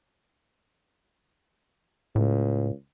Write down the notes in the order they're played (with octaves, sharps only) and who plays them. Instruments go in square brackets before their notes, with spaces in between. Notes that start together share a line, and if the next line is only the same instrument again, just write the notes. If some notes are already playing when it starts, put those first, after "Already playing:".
[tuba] C#2 [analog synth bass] A2